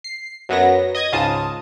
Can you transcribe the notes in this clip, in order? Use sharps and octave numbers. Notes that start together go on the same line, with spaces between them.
C7
F#2 F#3 B3 A#6
D#5 D#6 G#6
C#2 G#2 F4 A5 D#6